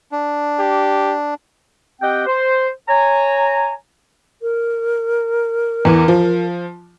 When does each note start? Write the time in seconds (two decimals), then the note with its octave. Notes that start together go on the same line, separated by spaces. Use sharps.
0.12 D4
0.59 G4
2.01 C4 G4 D#5 F#5 G5
2.26 C5
2.88 C#5 G#5 A#5
4.42 A#4
5.85 E2 E3
6.08 F3